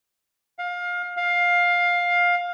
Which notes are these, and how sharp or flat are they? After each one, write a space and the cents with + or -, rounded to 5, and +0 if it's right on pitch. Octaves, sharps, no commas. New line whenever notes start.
F5 +25
F5 +15